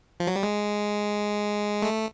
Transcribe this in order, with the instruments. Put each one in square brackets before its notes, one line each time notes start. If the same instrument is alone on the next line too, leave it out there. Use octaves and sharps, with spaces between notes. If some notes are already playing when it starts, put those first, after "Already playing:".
[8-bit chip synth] F3
F#3
G3
G#3
A3